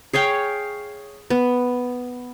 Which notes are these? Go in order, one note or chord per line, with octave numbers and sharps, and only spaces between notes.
G#4 C#5 F5 G5
B3